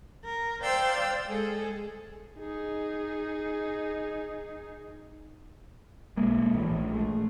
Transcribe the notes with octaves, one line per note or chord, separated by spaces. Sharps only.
A#4
C5 D5 F5 G5 C6 E6
G#3 G#4 A4
D#4 G#4
B1 G#3 A#3
A#1 A2 E3
G#3 A3